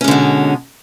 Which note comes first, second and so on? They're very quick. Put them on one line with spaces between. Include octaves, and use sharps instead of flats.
C#4 G#3 D3 B2